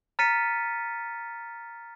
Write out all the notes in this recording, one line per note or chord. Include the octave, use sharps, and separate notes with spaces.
A#5 F6 A6 B6 C#7 D#7